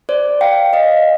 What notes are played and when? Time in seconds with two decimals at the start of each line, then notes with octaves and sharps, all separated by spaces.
0.09 C5 D5
0.41 F5 G5
0.73 D#5 F5